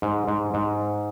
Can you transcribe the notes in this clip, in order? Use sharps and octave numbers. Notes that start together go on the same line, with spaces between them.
G#2
G#2
G#2